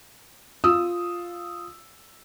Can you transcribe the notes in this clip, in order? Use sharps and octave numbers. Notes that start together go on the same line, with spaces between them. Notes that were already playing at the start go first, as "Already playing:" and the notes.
F4 D#6 E6